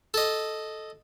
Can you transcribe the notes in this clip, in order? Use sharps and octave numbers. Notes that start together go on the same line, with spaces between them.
A4 D#5